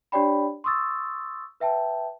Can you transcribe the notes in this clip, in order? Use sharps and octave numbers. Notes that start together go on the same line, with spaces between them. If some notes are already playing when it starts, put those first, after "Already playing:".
D4 G4 C#5 D5 G5 B5
C6 C#6 D#6 E6 A6
B4 E5 G5 A5